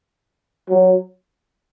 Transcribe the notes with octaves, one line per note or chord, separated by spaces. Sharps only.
F#3